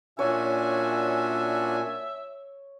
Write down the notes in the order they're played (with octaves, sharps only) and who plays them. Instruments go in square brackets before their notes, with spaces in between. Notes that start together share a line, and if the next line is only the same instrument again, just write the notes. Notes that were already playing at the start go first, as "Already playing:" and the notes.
[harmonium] A#2 G#5 [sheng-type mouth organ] C#4 D4 F#4 [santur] C#5 [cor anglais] E5